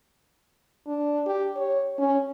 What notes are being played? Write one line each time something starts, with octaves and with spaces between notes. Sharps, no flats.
D4
G4
C#5
C#4